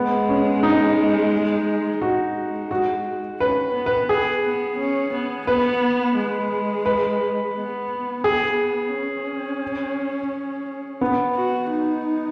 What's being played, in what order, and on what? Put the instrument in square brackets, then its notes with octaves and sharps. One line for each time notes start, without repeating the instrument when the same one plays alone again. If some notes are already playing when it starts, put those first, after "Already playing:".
Already playing: [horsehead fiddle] G#3 [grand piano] B3
[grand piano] C#4
D#4
[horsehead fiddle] G#3 [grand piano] F#4
[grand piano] F#4
[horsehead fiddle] C#4 [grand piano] B4
[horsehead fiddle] B3
[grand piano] B4
G#4
[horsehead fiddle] B3
C#4
B3
[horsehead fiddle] B3 [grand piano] B4
[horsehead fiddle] G#3
[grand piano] B4
[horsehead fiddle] B3
[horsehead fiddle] B3 [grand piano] G#4
[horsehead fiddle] C#4
[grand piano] B3
[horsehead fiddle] F#4
D#4